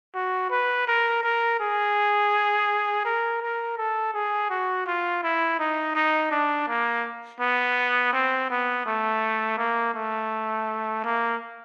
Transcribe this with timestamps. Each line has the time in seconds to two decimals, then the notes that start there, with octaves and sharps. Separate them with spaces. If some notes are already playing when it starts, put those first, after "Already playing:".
0.15 F#4
0.51 B4
0.87 A#4
1.23 A#4
1.60 G#4
3.05 A#4
3.42 A#4
3.78 A4
4.14 G#4
4.50 F#4
4.87 F4
5.23 E4
5.59 D#4
5.95 D#4
6.31 D4
6.68 A#3
7.40 B3
8.13 C4
8.50 B3
8.86 A3
9.58 A#3
9.94 A3
11.04 A#3